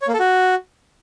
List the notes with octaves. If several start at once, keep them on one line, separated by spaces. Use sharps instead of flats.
C#5
A#3
A4
F#4